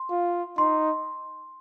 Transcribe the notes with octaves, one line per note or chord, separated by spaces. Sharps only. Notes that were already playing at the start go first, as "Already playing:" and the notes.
Already playing: C6
F4
D#4 C6